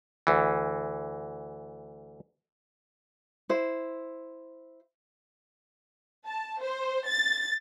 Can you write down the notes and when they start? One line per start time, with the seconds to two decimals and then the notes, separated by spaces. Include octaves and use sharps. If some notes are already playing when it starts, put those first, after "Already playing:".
0.27 D2 E3
3.49 E4 C5
6.27 A5
6.62 C5
7.07 A6